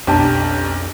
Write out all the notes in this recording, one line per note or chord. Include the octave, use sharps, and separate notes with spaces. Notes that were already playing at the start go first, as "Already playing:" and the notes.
B1 F2 C#4 D4 G4 G5 A5 A#5